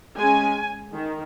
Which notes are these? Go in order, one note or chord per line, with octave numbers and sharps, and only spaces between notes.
G#3 C#4 G#5
D#3